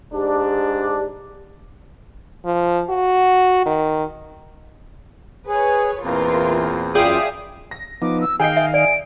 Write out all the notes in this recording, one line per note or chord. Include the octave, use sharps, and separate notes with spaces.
G#2 D4 G4
F3
F#4
D#3
G#4 B4 C#5
E2 A#2 E3 C4 F4 A#4
F#2 F4 G#4 D5 E5 F5 G5 D#6
A#6
F3 B3 D#4 D6
E6
D#3 G#4 D#5 F5 G5 C7
E5
D5 D7